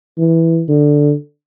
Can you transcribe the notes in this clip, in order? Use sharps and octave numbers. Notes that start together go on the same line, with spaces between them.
E3
D3